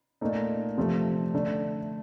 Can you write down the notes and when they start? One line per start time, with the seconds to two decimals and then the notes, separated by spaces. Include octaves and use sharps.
0.21 A#2 A3 D#4
0.78 C3 F3 A3
1.34 D3 A3 D4